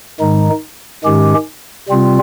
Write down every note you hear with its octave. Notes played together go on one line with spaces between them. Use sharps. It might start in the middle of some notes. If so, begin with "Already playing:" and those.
G#2 D#3 G#3 D#4
G#2 D#3 G#3 C#4 G4
C3 G3 C4 F4